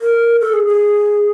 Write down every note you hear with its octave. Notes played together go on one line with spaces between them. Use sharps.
A#4
A4
G#4
G#4